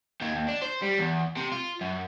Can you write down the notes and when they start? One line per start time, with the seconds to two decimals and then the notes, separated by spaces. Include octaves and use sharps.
0.22 D#2
0.36 D#2
0.49 D4
0.62 C5
0.82 G3
0.99 E2
1.37 C3
1.52 F4
1.81 F#2